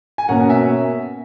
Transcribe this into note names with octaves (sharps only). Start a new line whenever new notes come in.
G#5
B2 A#3 C#4 F#5 A#5
E5 G#5